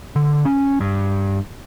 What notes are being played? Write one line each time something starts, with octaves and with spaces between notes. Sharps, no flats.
D3
C#4
G2